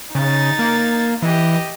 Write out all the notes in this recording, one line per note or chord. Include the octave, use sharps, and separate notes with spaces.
C#3 D#4 A6
A#3
E3 G4 D#5